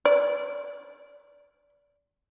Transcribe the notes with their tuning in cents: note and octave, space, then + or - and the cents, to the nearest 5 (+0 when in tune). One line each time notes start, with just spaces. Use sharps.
D5 -30